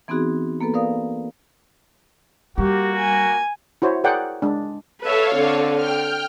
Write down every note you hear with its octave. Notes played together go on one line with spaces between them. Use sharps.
E3 B3 C4 D#4 F#4 G#4
A#3 B3 A4 B4
A#4 B4 D5 F5 D#6
G3 A#3 F#4 G4
G#5
E4 F#4 C5 C#5
G#4 A#4 C#5 D5 F#5 G5
G#3 D4
A4 B4 C#5 E5 F5
D3 C4
G5 F6